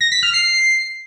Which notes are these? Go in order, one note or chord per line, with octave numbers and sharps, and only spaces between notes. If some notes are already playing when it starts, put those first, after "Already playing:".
A#6
B6
F6
C7